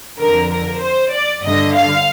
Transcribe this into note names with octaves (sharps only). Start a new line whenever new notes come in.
F2 D3 A#4
A#4
C5
D5
G2 D3 D#5
F5